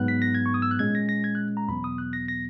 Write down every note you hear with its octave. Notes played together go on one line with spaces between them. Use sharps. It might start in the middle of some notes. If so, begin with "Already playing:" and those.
Already playing: G#2 F#3 B3 F#6
B6
A#6
G#6
C#6
D#6
E6
F#6
A#2 G#3 C#4 G#6
A#6
A#6
G#6
F#6
A#5
E2 B2 F#3 B3 B5
D#6
F#6
A#6
A#6